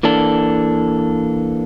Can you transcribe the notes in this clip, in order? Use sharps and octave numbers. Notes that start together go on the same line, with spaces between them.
E3 A#3 D4 A4